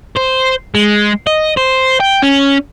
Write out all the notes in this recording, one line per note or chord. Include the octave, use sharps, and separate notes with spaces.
C5
G#3
D#5
C5
G5
C#4